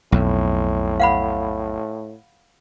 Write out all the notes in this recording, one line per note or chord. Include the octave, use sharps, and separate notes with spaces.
B1 F2 A2
F5 F#5 B5